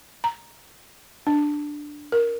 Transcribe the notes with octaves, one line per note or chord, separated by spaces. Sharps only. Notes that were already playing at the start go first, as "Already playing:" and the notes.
A#5
D4
A#4